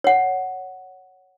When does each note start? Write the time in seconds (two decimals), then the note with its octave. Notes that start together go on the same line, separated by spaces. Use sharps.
0.04 C#5 F#5